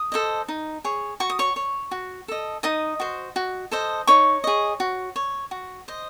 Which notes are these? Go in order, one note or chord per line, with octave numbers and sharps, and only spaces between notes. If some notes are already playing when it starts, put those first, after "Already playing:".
Already playing: D#6
A4 C5 D#5
D#4
G#4 C#5
F#4 C#6
D#6
C#5 C#6
C#5
F#4
A4 D#5
D#4 D#5 D#6
F#4 C5
F#4
A4 C5 D#5
D#4 C#5 C#6
G#4 D#5
F#4
C#5
F#4
C5 D#5